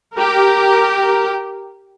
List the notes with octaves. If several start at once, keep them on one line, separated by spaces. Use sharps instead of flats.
G4 A#4